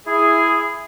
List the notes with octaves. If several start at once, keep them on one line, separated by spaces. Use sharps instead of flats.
E4 G#4